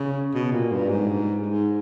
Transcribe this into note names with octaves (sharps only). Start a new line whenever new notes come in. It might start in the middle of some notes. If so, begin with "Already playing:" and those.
Already playing: C#3
B2
A#2
G2
G#2
G#2